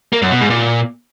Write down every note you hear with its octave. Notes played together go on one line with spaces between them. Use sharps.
A#3
F#2
B2
G#2
A#2